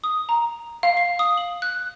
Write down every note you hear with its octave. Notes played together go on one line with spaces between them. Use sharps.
D#6
A#5
F5
C7
D#6
F#7
F#6